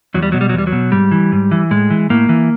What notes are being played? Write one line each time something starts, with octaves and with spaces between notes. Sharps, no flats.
E2 F#3
G3
B2 F#3
G3
E2 F#3
G3
F#3
B2
G#2 G3
E3
G#2
E3
A2 G#3
E3
A2 A#3
E3